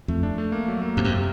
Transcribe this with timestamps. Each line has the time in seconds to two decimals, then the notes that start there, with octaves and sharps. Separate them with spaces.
0.08 F2 A3
0.23 D4
0.38 A3
0.52 A#3
0.68 F#3
0.82 A#3
0.97 F2 C3
1.05 F#2
1.12 C3